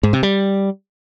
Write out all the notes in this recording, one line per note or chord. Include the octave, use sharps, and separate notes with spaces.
G#2
C3
G3